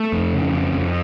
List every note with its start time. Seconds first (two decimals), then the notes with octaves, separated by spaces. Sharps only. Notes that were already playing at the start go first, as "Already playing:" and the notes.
Already playing: A3
0.13 F2
0.33 C#3
0.53 F2
0.73 F2